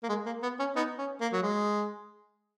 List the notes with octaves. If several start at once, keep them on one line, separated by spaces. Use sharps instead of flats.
A#3
G#3
A#3
B3
C#4
B3 D#4
C#4
A#3
F#3
G#3